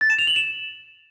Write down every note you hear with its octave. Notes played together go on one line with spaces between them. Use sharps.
A6
E7
F7
F#7
E7